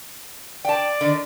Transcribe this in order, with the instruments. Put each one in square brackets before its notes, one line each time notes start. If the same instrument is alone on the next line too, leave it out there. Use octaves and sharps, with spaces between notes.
[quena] D5 [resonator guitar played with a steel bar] G5 A5
[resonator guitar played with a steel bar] D3 D#3